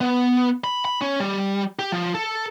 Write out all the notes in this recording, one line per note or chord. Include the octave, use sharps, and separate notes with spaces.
B3
B5
B5
C#4
G3
G4
F3
A4